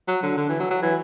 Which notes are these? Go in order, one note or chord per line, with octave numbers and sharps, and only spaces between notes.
F#3
D3
D3
E3
F#3
F#3
E3